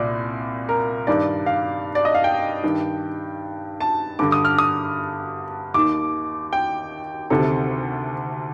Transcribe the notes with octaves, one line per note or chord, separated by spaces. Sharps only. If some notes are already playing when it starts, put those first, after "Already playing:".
Already playing: C2 A#2 D5
A#4
G2 D#3 D5
F5
D5
D#5
F5
G5
G2 D#3
A5
G2 D3 D6
D#6
F6
D#6
D#2 D#3 D6
G5
D2 C3 D#3 A4